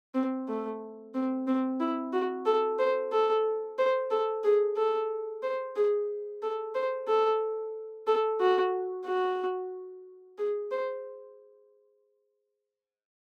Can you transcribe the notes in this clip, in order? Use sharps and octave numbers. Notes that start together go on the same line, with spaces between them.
C4
A3
C4
C4
E4
F#4
A4
C5
A4
C5
A4
G#4
A4
C5
G#4
A4
C5
A4
A4
F#4
F#4
G#4
C5